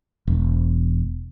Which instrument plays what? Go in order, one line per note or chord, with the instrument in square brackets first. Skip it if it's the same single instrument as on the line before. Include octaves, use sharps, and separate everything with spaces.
[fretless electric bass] E1